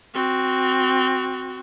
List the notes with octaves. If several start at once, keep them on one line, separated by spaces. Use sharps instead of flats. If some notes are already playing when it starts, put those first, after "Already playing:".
C4 F#4